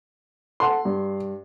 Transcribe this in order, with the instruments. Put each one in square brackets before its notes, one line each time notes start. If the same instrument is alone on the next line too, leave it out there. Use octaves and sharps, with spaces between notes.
[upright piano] A4 F#5 [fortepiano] C6
[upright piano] G2